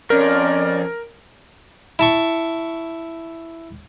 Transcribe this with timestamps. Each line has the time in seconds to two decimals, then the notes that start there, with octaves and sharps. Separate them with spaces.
0.10 F2 C#4 A#4 D5
1.99 E4 A5 C#6